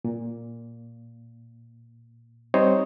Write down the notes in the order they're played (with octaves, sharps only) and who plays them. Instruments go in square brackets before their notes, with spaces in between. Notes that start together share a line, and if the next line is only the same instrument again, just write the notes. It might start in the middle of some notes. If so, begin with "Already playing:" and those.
[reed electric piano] A#2
G3 C4 D#4 C5 C#5 D#5